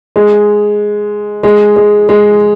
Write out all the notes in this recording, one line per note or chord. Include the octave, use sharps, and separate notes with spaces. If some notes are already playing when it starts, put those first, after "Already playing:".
G#3
G#3
G#3
G#3